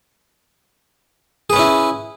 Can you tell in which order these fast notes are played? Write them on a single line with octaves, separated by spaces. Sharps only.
G#4 B4 C#4 E4